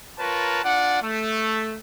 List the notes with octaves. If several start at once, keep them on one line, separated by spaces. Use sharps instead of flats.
F4 A#4 B4 C#5 A5 A#5
D4 F4 D5 F#5
A3